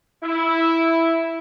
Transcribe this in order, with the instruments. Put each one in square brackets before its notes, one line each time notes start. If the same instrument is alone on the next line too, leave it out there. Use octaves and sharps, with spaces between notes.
[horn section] E4